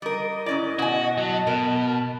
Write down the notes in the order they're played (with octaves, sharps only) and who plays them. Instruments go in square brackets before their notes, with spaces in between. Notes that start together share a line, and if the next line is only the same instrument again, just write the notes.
[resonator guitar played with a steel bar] G3 A#4 [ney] D#5 [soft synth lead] D#6
[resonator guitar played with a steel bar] G#2 C#4 D5 [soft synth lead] E4
[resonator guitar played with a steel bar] B2 G#5 [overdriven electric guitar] F#4
[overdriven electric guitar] F#3 [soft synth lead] A5
[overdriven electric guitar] B2 [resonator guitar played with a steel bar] A#4